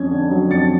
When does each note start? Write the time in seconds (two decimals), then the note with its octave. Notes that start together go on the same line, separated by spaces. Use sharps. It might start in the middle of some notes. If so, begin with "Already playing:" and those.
Already playing: F2 C#4 G#6
0.11 D3
0.31 F#3
0.51 F2 A6 C#7